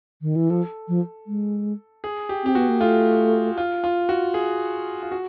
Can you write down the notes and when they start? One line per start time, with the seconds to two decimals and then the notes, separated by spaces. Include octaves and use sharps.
0.22 D#3
0.36 E3
0.50 F3 A4
0.88 F3
1.27 G#3
2.04 G#4
2.29 G4
2.44 C4 G4
2.55 B3 F#4
2.69 A#3
2.80 A3 F4
3.57 F4
3.84 F4
4.09 F#4
4.34 G#4
5.03 F4
5.11 F#4